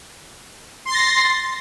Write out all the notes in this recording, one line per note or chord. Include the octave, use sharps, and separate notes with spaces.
C6 A6 A#6 C7